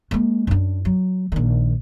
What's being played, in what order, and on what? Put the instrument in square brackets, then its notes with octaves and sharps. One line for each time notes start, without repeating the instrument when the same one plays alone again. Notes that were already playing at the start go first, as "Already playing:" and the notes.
[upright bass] G#3 A#3
F#2 D4
F#3
A#1 D#3